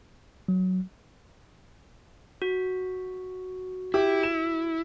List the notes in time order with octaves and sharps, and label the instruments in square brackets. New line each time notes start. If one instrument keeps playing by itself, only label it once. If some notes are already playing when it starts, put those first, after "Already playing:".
[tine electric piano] F#3
[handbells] F#4
[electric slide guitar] E4 [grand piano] G4
[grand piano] E7